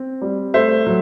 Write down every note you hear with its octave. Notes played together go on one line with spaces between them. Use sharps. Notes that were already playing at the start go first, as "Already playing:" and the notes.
Already playing: C4
G3
A3 C5 E5
F#3